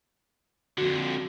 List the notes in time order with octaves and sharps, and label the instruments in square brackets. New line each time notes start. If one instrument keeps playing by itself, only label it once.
[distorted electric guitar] F2 D3 [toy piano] F#4